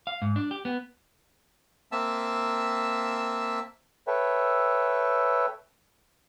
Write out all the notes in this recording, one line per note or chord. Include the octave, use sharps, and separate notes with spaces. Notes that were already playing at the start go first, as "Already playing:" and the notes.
F5
G#2
D4
G4
B3
A#3 C4 E5 A5 E6
A4 B4 C#5 E5 G5